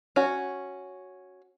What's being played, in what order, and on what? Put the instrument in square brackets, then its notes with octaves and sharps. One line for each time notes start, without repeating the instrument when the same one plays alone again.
[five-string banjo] C#4 F#4